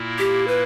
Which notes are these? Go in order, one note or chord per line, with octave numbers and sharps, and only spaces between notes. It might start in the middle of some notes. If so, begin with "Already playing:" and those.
Already playing: A#2 A#3 E4
G4
B4